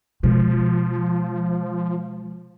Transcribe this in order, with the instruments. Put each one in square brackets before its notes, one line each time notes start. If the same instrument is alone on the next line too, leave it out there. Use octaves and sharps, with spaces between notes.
[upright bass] B2 G#3 [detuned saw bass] F3